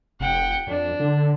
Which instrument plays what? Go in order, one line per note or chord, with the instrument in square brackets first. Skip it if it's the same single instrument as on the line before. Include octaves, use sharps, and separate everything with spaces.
[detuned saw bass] F1 [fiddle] F#5 G5
[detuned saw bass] F2 [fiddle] D4
[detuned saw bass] D3